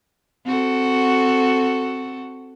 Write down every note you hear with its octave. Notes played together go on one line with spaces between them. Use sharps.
C4 F#4 A4